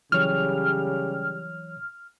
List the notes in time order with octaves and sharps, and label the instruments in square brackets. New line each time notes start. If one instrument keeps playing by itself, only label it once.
[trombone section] C#3 G3 G4 [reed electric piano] E3 F#3 C#5 [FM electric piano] F6